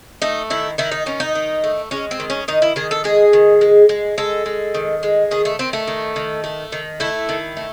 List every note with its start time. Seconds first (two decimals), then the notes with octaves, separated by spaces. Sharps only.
0.22 A3 D#4
0.50 D#3 E4
0.78 D#3 E4
0.92 D#4
1.06 D#3 C#4
1.20 D#4
1.35 D#3
1.64 A3
1.91 G#3 C#4
2.11 C4
2.20 D#3
2.30 C#4
2.48 D#3 D#4
2.62 E4
2.76 D#3 G#4
2.91 A4
3.04 G#3 G#4
3.33 D#3
3.61 G#3
3.89 G#3
4.18 G#3 A4
4.46 G#3
4.74 D#3
5.03 G#3
5.31 D#3 G#4
5.45 A3
5.59 D#3 C4
5.73 A3
5.87 D#3
6.16 D#3
6.44 A3
6.72 D#3
7.00 A3 E4
7.29 D#3
7.57 A3